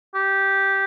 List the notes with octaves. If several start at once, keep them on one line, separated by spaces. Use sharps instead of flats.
G4